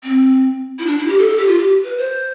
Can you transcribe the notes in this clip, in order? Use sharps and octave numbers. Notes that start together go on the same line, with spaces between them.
C4
E4
D4
E4
G4
A4
A4
G4
F4
G4
B4
C5